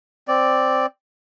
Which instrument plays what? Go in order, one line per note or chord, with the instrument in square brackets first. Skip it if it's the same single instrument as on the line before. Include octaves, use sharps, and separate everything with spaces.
[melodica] C4 D5